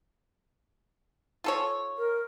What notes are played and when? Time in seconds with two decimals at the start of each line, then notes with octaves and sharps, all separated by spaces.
1.44 F4 A4 C#5
1.98 A#4